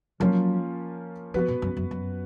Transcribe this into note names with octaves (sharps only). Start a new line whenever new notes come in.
F3 F#3 A#3 C#4 F4
F3 B3 F#4 B4
A#2
F#2
F#2
F#2